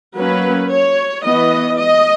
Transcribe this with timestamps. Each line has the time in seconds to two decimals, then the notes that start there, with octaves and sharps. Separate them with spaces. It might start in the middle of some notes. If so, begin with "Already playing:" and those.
0.17 F#3 A#3 C#4 B4
0.70 C#5
1.24 E3 B3 D#5
1.78 D#5